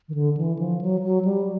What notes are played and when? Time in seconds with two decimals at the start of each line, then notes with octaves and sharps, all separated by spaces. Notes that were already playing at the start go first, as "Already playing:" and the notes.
0.09 D#3
0.14 D3
0.37 E3
0.59 F3
0.81 F#3
1.04 F#3
1.25 G3